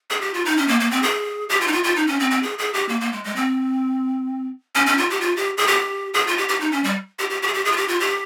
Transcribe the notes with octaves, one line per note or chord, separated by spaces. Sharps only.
G#4
G4
F4
D#4
C#4
A#3
A#3
C4
G#4
G4
F4
D#4
F4
F4
D#4
C#4
C4
C4
G#4
G#4
G4
A#3
A#3
G#3
G#3
C4
C#4
C#4
F4
G4
F4
G4
G#4
G4
G#4
F4
G4
G4
D#4
C#4
G3
G4
G4
G4
G#4
G4
G#4
F4
G4
F4
G4